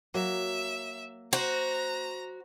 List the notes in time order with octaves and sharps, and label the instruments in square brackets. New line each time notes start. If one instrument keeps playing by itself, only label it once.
[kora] F#3 A#3 [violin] E5
[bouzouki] F#4 [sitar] C5 [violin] A#5